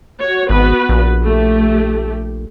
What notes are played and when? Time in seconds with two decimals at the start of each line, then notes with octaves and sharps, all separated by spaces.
0.18 F#4 C#5
0.50 G#1 B3 F#4 B4
0.89 A#1
1.23 A3 G4